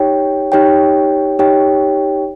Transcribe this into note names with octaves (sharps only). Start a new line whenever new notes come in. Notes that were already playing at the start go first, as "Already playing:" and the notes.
Already playing: D#4 G4 C#5 G5
D#4 G4 C#5 G5
D#4 G4 C#5 G5